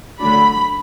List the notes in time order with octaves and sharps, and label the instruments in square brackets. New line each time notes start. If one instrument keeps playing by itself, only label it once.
[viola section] D3 F#3 A3 D4 B5